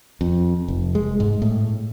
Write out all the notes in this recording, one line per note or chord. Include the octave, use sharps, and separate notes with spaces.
F2
F1
G#3
G#2
A2